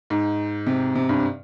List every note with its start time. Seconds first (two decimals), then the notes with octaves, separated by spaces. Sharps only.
0.10 G#2
0.66 C3
0.95 C3
1.09 G2